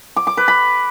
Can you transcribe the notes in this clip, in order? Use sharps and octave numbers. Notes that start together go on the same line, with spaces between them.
D6
D6
B4
B5